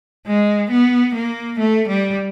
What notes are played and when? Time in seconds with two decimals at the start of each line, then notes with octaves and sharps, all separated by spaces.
0.27 G#3
0.71 B3
1.15 A#3
1.59 A3
1.88 G3